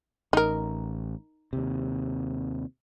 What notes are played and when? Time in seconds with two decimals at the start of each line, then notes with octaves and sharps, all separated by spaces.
0.33 A1 D#4 A#4
1.53 D#2 C3